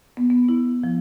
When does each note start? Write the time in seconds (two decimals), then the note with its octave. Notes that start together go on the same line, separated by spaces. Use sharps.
0.17 B3
0.30 B3
0.49 E4
0.84 F3